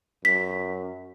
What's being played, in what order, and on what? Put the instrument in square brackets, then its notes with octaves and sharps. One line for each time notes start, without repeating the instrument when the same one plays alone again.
[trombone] F#2 [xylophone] B6